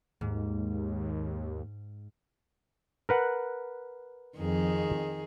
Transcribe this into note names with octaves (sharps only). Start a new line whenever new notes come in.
D#2 G#2
A#4 B4 F#5
F2 D#3 G#4